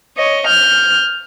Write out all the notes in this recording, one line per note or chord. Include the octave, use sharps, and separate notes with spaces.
C#5 D#5
F6 G6